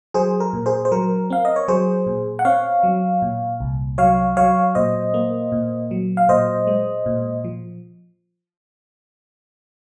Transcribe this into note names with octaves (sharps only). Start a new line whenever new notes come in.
F#3 G#4 C5
A#4
A#2
G#4 C5
C5
F#3 A#4
C4 F5
D#5
C#5
F#3 G#4 C5
A#2
F#5
C4 C#5 F5
F#3
A#2
C2
F#3 C#5 F5
F#3 C#5 F5
A#2 C5 D#5
A#3
A#2
F#3
F5
A#2 C5 D#5
G#3
A#2
F3